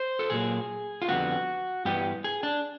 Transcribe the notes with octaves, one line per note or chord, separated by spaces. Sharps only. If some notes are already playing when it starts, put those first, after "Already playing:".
Already playing: C5
A4
A#2 F#3 A#3 G#4
F4
F2 D3 G3 B3 F#4
G2 E3 G3 B3 G4
G#4
D4